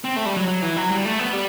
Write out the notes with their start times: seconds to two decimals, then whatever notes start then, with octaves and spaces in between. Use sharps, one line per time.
0.05 C4
0.17 A3
0.26 G3
0.37 F#3
0.48 F#3
0.63 E3
0.77 F#3
0.91 G3
1.05 A3
1.19 B3
1.33 G3